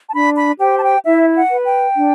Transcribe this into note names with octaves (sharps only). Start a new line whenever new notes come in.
A5
D4 B5
B5
G4 C5 G5
A5
G5
E4 E5
F#5
B4
G5
D4